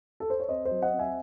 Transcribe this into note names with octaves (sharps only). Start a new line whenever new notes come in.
A4
C5
C#5
C4 C5 D#5
C5 D#5
F#3
D#5 F#5
C4
E5 G#5